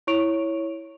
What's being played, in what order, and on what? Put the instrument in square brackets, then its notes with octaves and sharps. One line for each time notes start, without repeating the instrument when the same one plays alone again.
[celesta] E4 C#5 C#6 D7 F7